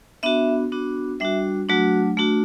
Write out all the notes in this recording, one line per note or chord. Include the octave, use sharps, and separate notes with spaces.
B3 D4 F#4 E5
B3 D4 F#4
G3 D4 F#4 E5
F#3 A3 D4 F#4
A3 D4 F#4